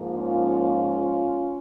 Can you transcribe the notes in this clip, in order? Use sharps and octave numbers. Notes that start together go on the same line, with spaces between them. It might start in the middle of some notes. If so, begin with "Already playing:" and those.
Already playing: G#2 F3 A#3
C#4 F4